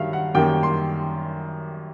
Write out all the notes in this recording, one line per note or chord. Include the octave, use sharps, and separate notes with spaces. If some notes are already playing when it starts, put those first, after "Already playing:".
Already playing: G2 D#3 F#3 E5 F5
F#5
F#2 D#3 G3 A#3 G5
C6